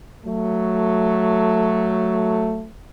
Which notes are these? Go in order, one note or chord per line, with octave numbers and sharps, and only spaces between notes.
F#3 A3